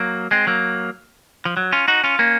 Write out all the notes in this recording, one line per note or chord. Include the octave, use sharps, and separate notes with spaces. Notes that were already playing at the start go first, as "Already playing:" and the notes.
Already playing: F#3 A#3
G#3 C4
F#3 A#3
F3
F#3
C#4 F4
D#4 F#4
C#4 F4
A#3 C#4